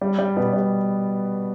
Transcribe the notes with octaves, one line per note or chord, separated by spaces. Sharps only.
G3
G3
B2 B3
G3